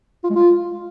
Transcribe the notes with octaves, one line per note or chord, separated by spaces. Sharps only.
F4
G#3
F4